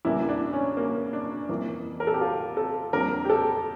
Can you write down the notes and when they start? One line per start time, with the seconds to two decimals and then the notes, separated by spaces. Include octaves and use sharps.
0.05 E2 C#3 G3 A#3 E4
0.29 D4
0.53 C#4
0.77 A#3
1.13 D4
1.49 F2 E3 A#3
2.00 A#4
2.07 A4
2.14 G4
2.21 F4
2.57 A4
2.93 F2 D3 G3 A#3 A#4
3.25 G4
3.30 A4